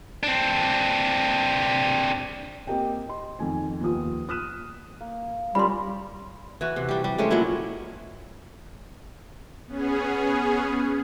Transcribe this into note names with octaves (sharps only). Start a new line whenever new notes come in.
C4 D4
A#3 C4 G4 A#4 D#5 G5
D#5 C6
F2 D#3 G#5
D#2 F3 B3 F4 D#6
D#6 F6 F#6 B6 D#7 E7
A#3
G3 C#4 F4 A#4 B5 C6
E3 F#4
C3
G3 G4
G3
G#3 A3 C#4 C5
A#2 F#3 E4
B3 C#4 G#4